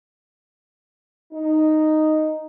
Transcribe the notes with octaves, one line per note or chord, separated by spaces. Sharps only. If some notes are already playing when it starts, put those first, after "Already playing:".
D#4